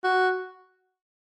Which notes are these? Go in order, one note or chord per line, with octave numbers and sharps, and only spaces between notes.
F#4